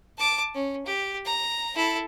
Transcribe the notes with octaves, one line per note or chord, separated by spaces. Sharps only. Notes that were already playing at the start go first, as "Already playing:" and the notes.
A5 D6
C#4
G4
A#5
E4 A4